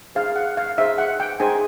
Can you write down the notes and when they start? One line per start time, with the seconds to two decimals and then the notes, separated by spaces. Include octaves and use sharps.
0.15 D#4 G#4 C5 F5
0.36 F#5
0.57 F5
0.78 D#4 G#4 C5 E5
0.98 F#5
1.20 G5
1.40 D#4 G#4 C5 G#5